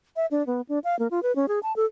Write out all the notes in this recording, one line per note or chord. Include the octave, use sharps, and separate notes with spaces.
E5
D4
B3
D4
F5
A#3
F4
B4
C#4
G#4
A5
A4